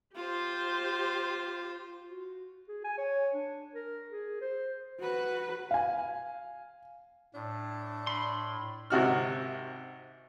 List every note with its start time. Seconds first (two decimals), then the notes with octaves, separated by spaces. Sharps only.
0.16 F4 G4 C5
2.09 F#4
2.68 G#4
2.84 G#5
2.98 C#5
3.34 D4
3.75 A#4
4.10 G#4
4.41 C5
5.00 F#4 B4
5.71 F5 G#5
7.34 A2 D4
8.07 B5 C6
8.90 G#1 C3 F#4 F6